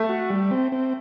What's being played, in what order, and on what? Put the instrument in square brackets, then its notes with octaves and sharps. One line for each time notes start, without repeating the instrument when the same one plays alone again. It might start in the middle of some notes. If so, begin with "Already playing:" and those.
Already playing: [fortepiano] A3
[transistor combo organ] F#4
G3
C4
C4